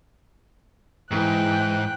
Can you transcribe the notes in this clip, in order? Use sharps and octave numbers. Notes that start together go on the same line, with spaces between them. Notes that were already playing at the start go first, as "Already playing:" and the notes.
G#2 E3 G5 F#6